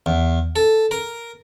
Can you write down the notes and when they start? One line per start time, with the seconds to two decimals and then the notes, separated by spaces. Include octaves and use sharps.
0.06 E2
0.56 A4
0.91 A#4